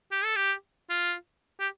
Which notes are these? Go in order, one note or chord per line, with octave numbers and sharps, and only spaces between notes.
G4
A4
G4
F4
G4